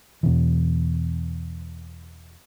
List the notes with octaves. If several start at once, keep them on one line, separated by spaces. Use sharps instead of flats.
E2 B2 E3